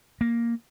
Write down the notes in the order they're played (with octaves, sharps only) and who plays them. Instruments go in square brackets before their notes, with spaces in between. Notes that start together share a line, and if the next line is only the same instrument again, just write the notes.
[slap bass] A#3